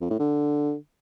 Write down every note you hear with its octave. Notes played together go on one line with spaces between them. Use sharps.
F2
A2
D3